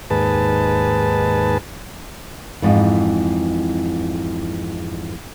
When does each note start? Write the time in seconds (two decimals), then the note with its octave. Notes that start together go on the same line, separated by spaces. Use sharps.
0.10 D#2 G#2 G#4 B4 A5
2.62 F2 G#2 E3